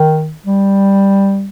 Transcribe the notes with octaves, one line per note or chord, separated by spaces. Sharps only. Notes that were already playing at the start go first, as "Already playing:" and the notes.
Already playing: D#3
G3